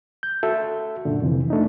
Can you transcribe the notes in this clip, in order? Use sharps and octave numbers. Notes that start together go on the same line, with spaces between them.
G6
F#4 A4 E5
F#2 A#2 D3
F2 C3 E3
A3 D4 D#4